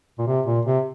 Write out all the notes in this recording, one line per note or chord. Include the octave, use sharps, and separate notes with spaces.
A#2
C3
A#2
C3